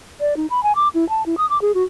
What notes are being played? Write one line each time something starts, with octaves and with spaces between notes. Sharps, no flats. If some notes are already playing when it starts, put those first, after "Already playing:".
D5
D#4
B5
G#5
D6
E4
A5
E4
D#6
D6
G#4
F#4